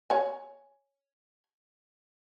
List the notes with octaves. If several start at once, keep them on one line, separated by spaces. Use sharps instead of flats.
C#5 G#5